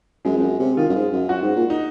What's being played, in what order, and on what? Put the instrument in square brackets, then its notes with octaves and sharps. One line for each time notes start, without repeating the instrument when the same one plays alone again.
[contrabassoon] F#2 [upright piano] G#3
[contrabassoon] F2
F#2
C3
[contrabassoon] D#3 [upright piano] F4
[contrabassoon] F#2
G#2
F#2
[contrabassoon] F#2 [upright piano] F#4
[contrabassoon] G#2
A#2
[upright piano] D#4